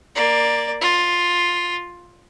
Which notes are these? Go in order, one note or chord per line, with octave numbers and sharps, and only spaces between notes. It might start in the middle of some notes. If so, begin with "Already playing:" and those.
A#3 D5
F4